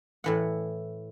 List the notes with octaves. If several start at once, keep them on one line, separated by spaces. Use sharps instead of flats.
A2 E3 F#5